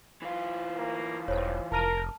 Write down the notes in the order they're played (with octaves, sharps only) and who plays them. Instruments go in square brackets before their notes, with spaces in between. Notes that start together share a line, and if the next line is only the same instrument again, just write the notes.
[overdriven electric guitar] E3 F4
[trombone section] A2 A#3
[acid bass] E1 [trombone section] C#2 G2 [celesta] C5 C#5
[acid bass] F1 [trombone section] A#4 [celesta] A5 F6 D#7